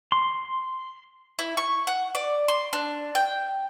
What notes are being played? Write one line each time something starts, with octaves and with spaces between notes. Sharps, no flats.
C6
E4
C#6
F#5
D5
C6
D4
G5